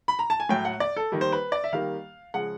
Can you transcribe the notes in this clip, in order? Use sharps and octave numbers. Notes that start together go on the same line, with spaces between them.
B5
A#5
A5
G#5
A2 F#3 A3 G5
F#5
D5
A4
D#3 G3 A#3
C5
B4
D5
E5
D#3 G3 A#3 F5
C#3 F3 G#3 F#5